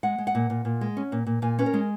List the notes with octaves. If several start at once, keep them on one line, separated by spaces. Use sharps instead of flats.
G#3 F#5
G#3
F#5
A#2
A#2
A#2
G#3
C#4
A#2
A#2
A#2 G#5
C#4 B4
A#4
G#3